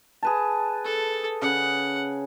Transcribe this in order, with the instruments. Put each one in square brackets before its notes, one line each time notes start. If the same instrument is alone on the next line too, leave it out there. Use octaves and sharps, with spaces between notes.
[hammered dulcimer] G#4 B4 A5
[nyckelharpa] A4
[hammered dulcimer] C#3 [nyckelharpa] F#5